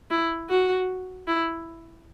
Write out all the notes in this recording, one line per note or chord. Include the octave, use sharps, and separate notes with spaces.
E4
F#4
E4